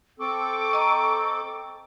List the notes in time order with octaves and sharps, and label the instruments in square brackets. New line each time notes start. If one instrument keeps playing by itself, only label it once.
[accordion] C4 A4 [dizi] C#6 [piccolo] D6
[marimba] D#5 A#5